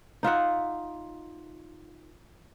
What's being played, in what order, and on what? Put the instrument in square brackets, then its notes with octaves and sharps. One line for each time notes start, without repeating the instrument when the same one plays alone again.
[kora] D#4 F4 E5 F#5